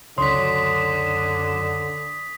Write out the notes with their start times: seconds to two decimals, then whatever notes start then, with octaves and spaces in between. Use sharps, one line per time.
0.18 C#2 F#2 D3 C#5 C6 D#6 B6 E7